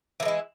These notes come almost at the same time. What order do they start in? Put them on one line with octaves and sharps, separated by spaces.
E3 A#3 G#3 E4